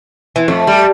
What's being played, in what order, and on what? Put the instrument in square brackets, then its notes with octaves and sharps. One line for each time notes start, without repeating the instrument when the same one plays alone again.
[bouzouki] E3 C4
[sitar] F2 [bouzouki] A3
[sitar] G3